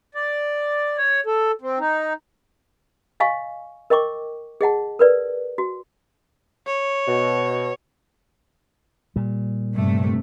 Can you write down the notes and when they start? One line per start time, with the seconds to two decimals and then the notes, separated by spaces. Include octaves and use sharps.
0.15 D5
0.98 C#5
1.26 A4
1.61 C4
1.79 D#4
3.20 D#5 F5 G#5 C#6
3.90 A#4 D#5 G5 C#6 D6
4.61 G#4 D#5 F#5 A5
4.99 A#4 B4 D5
5.58 F#4
6.67 C#5
7.07 B2
9.16 A#2 G3
9.74 G2 C3 A3